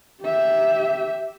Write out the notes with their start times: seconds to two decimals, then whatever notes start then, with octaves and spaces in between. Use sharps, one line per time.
0.23 G4 E5